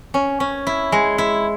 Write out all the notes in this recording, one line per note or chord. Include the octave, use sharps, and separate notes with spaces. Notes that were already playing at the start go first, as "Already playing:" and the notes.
C#4
C#4
E4
G#3
E4